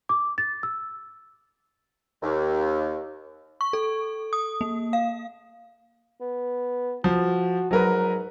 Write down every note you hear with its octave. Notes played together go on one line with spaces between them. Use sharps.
D6
A6
E6
D#2
C#6
A4
D#6
A#3
F5
B3
F3 F#4
G#2 F#3 A#4 B4